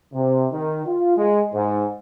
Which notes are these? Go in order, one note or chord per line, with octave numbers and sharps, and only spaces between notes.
C3
D#3
F4
G#3
G#2